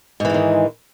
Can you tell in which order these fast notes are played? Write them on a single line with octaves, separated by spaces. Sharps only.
G#2 E3 G#3 D#3